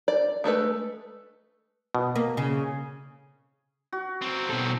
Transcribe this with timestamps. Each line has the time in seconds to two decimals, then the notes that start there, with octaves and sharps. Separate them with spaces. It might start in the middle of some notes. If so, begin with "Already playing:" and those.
0.08 D5
0.44 G#3 A3 A4 B4
1.95 B2
2.15 A#3
2.37 C#3
3.93 F#4
4.22 F#3 C4
4.50 B2 A4